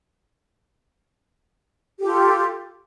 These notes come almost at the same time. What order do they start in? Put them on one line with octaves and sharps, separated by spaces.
G4 A4 F4